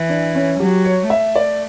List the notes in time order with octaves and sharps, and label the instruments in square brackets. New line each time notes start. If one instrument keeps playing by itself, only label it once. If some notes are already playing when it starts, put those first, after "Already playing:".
Already playing: [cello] E3
[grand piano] D4
C#4
[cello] F#3 [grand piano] G4
[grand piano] C#5
[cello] A3 [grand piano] E5
[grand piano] D5